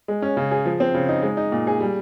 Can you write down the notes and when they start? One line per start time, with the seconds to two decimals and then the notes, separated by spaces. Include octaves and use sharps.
0.08 G#3
0.22 C#4
0.37 C#3
0.51 G#4
0.66 F3
0.80 C4
0.94 C#3
1.09 D#4
1.23 G#3
1.37 D#4
1.52 A#2
1.67 G#4
1.80 G3